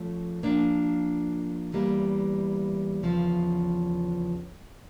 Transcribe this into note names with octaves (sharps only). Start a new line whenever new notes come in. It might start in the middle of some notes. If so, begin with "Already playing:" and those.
Already playing: F3 A3 C#4
F3 A#3 D4
E2 E3 G3 A#3
E2 C#3 F3 C#4